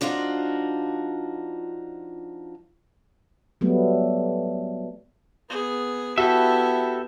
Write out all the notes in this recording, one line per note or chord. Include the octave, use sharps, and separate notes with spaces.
F3 D4 D#4 F4 F#4
F#3 G3 A3 B3
B3 G#4
B3 E4 F#4 G4 A4 E5 A5